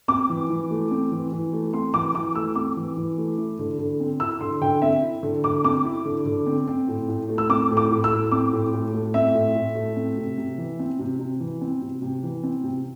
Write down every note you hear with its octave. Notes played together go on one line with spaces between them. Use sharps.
C4 D6
E3
E3
A3
C4
E3
E3
A3
C4 C6
E3 D6
E3 D6
A3 E6
C4 D6
E3
E3
A3
E4
D3
D3
C4
E4 E6
D3 C6
D3 G5
C4 E5
E4
D3
D3 D6
C4 D6
E4
D3
D3
C4
C4
A2
A2
A3
E6
C4 D6
A2
D6
A2
E6
A3
C4 D6
A2
A2
A3
C4 E5
A2
A2
A3
C4
C3
C3
E3
C4
C3
C3
E3
C4
C3
C3
E3
C4
C3